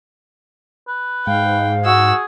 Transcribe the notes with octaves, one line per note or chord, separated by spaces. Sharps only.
B4
G#2 F5 G5
F#4 G#4 E6